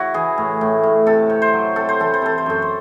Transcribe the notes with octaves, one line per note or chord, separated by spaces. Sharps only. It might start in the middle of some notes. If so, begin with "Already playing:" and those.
Already playing: C#3 E4 F#4
E3 G#4
A2
A2
A2
C3 A4
C3
C5
F#3
C3 A4
C5
E3 A4
C5
C3 A4
C5
F#2 A4
C5